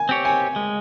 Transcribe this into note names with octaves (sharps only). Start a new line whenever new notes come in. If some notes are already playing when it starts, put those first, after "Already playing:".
Already playing: G#5
C4 G4 C#5
G#5
G#3